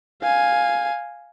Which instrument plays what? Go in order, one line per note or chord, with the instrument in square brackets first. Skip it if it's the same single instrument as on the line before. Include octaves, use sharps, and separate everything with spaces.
[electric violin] F5 G#5